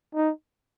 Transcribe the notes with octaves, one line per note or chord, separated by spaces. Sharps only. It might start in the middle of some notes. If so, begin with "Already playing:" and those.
D#4